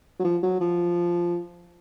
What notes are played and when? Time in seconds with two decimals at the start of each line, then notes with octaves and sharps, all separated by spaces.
0.19 F#3
0.24 F3
0.43 F#3
0.60 F3